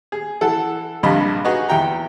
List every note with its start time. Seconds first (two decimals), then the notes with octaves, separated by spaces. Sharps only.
0.12 G#4
0.41 E3 A4 F#5
1.03 A#1 G2 C3 D#5 B5
1.45 D#4 F#4 G#4 B4 D#5
1.69 E2 E4 G5 A#5